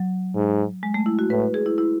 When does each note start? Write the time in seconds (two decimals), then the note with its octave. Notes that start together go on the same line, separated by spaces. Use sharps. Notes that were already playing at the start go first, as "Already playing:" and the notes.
Already playing: F#3
0.35 G#2
0.83 G#3
0.94 A3
1.06 E4
1.19 F#4
1.30 A2 B4
1.54 G#4
1.66 E4
1.78 E4